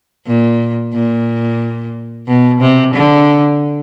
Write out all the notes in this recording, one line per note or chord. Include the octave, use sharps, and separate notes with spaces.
A#2
A#2
B2
C3
D3